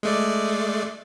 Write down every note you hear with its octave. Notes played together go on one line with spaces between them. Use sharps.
G#3 A3 D5